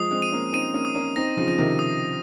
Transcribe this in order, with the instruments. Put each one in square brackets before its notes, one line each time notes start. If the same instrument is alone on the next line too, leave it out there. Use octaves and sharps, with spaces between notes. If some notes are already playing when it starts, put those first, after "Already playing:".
Already playing: [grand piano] F3 G#3 [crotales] D#6
[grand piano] G#3 C4
[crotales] D#7
[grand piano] A#3 C#4
[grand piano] C4 D#4 [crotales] D#7
[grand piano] A#3 C#4
[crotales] D#6
[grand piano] A#3 C#4
[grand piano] C4 D#4 [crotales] A#6
[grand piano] C#3 F3
[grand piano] F3 [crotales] D#7
[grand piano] C3 D#3
[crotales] D#6